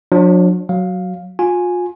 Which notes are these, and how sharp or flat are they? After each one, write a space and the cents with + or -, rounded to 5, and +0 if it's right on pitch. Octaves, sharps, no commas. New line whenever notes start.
F#3 -45 D4 +0
F#3 +0 F5 +10
F4 +35 G#5 +0